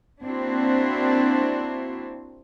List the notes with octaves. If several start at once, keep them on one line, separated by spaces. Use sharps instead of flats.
A#3 C4 D4 E4 F#4